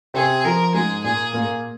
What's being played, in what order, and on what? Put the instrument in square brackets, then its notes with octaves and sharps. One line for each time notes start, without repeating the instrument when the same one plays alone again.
[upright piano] C3 C4 [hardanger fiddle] G#4
[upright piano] F3 [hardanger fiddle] A#4
[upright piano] G#2 G#3 [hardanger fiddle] G#4
[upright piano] A#2 A#3 [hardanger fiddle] G#4
[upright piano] A#2 A#3